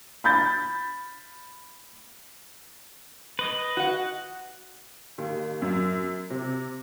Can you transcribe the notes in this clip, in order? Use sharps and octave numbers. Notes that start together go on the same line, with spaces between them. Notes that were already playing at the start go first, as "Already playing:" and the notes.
B5 G6 A6
B4 D#5
F#4 F#5
D#2
F#2
C3